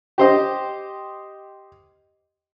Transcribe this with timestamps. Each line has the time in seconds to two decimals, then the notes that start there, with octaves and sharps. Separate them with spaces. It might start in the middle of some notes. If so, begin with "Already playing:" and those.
0.18 G4 C5 D#5